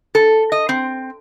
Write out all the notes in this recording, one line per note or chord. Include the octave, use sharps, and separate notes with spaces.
A4
D#5
C4